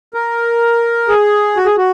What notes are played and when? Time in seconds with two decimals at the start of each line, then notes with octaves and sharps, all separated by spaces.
0.14 A#4
1.09 G#4
1.57 F#4
1.66 G#4
1.77 F#4